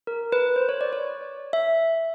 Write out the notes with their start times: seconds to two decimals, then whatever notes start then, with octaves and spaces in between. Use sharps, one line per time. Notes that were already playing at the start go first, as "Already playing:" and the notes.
0.07 A#4
0.32 B4
0.56 C5
0.69 C#5
0.81 D5
0.93 C#5
1.53 E5